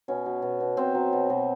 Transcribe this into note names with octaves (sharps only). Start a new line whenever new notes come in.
B2 C#4
B2
B2
B2
B2 C4
F#3
B2
B2